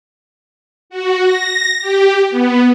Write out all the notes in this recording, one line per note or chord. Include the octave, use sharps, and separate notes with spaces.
F#4
A#6
G4
B3